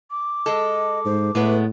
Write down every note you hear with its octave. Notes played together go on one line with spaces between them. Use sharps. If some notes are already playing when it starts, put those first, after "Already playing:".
D6
G#3 A4 D#5
G#2 C5
A2 G#3 A3 B3 B4